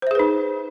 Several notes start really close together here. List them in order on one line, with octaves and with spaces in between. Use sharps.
C5 E5 G#4 B4 D#4